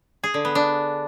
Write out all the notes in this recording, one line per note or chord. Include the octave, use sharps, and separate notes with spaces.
G#4
D3
B3
D4